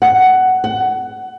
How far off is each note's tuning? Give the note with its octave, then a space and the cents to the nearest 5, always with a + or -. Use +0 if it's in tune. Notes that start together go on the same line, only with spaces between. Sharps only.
F#5 +10
F#5 +20